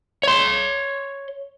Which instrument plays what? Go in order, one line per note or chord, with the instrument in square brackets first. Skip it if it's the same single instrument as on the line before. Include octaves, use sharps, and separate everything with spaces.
[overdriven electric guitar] C#5 C6